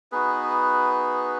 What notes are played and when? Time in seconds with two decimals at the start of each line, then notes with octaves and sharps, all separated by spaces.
0.12 B3 D#4 F#4 G#4 B4